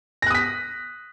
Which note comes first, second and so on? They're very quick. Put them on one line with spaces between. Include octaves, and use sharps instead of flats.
A#6 F#6 D#6 B6